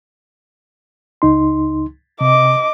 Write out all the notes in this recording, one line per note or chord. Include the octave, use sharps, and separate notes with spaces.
C#2 D#4 C6
C3 D#5 D6